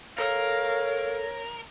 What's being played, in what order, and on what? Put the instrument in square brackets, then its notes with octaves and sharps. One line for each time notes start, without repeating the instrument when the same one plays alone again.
[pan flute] A4 [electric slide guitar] A#4 [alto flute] C#5 [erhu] F5